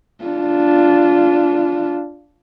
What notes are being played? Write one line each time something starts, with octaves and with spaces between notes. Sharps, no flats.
D4 F4